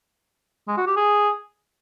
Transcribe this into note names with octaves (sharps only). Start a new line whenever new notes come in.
G#3
F#4
G4
G#4